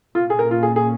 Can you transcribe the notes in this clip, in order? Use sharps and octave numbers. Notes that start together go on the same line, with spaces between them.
A#2 A#3 C#4 F4
G#4
A#4
F4
G#4
G#4